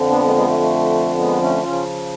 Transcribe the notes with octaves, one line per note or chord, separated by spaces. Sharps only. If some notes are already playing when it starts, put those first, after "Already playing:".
Already playing: F2 D3 F3
B3 D4
G#3 B3
G#3 B3
A3
A3
G#3 B3
A3 C#4
C#3 F3 C#4 F4